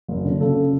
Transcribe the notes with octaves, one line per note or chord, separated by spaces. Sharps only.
F#1
D3
C#3 A4